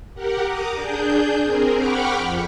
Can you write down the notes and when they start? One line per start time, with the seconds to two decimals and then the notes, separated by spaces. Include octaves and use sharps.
0.15 G4 A#4 F#5
0.44 A#5 D6 D#6
0.74 D4 G#4 G6
1.44 C4 G#4 A#4
1.74 F#5 G5 B5 C#6 D6 F6
2.16 F2